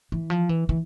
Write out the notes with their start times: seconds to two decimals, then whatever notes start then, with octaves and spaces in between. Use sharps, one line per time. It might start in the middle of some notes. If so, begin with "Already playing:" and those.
0.12 E3
0.30 F3
0.49 E3
0.69 E3